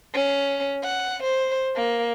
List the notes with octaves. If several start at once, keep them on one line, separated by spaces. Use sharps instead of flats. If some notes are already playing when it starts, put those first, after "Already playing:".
C#4
F#5
C5
A#3